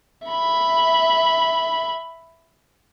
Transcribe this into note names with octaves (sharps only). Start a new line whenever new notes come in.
E5 B5